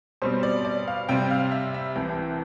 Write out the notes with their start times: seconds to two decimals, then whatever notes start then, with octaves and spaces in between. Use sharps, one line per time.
0.22 B2 G3 C4 C5
0.43 D5
0.65 D5
0.88 F5
1.09 C3 G3 C4 G5
1.31 F5
1.52 E5
1.74 E5
1.96 C2 C3 E3 G5